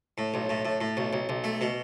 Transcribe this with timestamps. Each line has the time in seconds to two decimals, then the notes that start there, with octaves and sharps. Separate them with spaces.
0.18 A2
0.34 B1
0.49 A2
0.65 A2
0.81 A2
0.97 B1
1.13 B1
1.29 B1
1.44 A3
1.61 B2